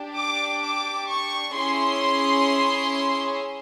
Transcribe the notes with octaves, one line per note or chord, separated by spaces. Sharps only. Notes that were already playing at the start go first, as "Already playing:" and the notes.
Already playing: D4 G4
D6
D6
C#6
C#4 E4 G#4 C6